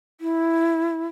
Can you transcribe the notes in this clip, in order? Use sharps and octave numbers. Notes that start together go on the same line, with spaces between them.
E4